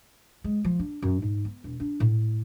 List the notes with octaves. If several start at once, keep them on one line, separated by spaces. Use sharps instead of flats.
G#3
F3
D4
F#2
G#2
B3
E1
D4
A2